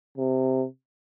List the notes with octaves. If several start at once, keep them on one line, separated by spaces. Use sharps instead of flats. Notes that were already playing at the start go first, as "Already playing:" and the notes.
C3